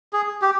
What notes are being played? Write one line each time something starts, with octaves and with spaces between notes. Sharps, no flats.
G#4
G4